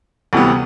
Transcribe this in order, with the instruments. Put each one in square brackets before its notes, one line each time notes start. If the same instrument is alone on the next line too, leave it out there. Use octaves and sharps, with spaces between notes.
[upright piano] D2 C3 E3 G3 B3